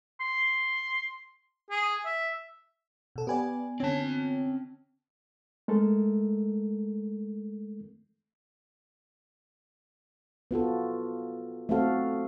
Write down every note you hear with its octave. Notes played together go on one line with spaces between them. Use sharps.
C6
G#4
E5
B2 A4
B3 G4 B4 D5 G#5
D3 C4 C#4 A5
G#3 A3 A4 A#4
B3 F4 F#4 A4
A3 C4 E4 F#4 A4 F5